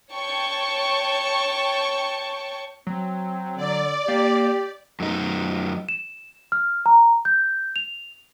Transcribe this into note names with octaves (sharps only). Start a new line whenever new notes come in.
C#5 G5 A5 C#6
F#3 C4
D3 D5
A#3 G4
F#2 D#4
E7
F6
A#5
G6
F7